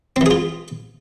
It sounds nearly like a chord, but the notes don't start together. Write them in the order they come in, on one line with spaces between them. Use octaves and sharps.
C4 E3 G#4 F4